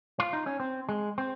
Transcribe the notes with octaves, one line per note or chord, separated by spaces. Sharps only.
F4
D#4
C#4
C4
G#3
C4